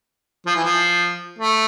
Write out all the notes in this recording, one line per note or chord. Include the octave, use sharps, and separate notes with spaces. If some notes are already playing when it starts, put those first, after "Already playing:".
F3
E3
F3
A3